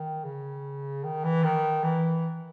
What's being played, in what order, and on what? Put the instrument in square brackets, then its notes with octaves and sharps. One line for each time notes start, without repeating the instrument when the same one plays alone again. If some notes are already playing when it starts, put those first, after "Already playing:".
Already playing: [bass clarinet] D#3
C#3
D#3
E3
D#3
E3